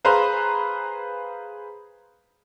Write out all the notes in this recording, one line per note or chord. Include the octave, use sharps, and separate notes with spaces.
G#4 B4 C5 F5 A#5 C6